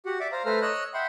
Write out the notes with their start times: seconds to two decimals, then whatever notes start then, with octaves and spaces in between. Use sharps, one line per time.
0.06 F#4 G4 F#5
0.20 D5 E5 D6
0.32 C5 F5 A#5
0.45 A3 A4 B4 C5 A#5 F6
0.62 C#5 D#5 E6 F#6
0.94 E5 F#5 G5 B5 C6